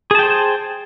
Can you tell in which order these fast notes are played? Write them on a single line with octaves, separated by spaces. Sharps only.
G#4 A5 G5 C5